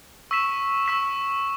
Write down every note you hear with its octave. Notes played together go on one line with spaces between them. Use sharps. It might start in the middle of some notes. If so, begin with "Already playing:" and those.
C#6 E6 B6 E7
C#6 E6 B6 E7